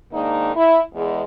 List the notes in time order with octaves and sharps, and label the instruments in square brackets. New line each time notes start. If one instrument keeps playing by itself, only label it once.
[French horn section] G#2 D#3 A#3 D4 D#4
E4
E2 G#3